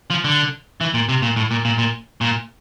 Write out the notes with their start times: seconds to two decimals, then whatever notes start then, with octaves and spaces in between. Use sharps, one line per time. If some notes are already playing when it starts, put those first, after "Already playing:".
0.10 F3
0.24 D3
0.81 E3
0.94 A#2
1.09 C3
1.22 A#2
1.36 A2
1.51 A#2
1.65 A#2
1.78 A#2
2.21 A#2